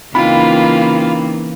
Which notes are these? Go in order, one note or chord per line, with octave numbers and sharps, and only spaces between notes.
C#3 E3 A#3 C4 D#4 F4 G5 B5